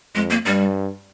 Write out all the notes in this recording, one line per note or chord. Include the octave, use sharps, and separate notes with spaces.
F2 G#3
A#3
G2 G3